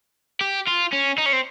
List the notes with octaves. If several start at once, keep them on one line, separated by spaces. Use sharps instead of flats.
G4
F4
C#4
D#4
C#4
C4